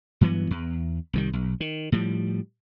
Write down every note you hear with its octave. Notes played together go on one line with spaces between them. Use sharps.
G2 E3 F#3 B3
E2
C2 D#3 G3
B1
D#3
A2 F3 G3